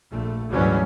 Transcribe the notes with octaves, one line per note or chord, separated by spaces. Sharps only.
A#1 A3
D2 G#2 E3 F#3 G3 C#4